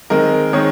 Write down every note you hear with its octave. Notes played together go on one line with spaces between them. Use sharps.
D#3 G#3 C4 A#4
D#3 G#3 C4 C#5